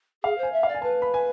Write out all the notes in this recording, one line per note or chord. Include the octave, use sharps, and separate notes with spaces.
G#4 F5
C5
G#5
E5
D5 F5
G#5
B4 A5
B5
G#5